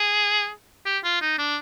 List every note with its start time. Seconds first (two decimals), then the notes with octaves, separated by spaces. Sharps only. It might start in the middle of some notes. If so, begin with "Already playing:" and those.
Already playing: G#4
0.86 G4
1.04 F4
1.21 D#4
1.38 D4